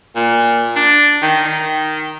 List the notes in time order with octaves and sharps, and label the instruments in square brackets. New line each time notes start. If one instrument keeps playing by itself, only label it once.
[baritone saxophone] A#2
D4
D#3
D#3